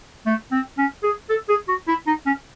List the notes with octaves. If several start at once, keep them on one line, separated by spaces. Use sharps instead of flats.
A3
C4
C#4
G#4
A4
G#4
F#4
E4
D#4
C#4